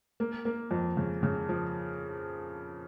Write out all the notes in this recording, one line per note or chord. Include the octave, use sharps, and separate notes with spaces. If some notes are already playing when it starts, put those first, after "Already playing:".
A#3
A#3
F2
C#3
C#3
F3